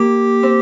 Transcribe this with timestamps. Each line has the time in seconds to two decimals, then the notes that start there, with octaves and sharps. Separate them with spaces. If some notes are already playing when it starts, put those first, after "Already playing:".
Already playing: A#3 G4
0.43 C4